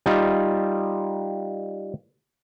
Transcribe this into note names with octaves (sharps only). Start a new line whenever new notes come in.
G3 D#4 F4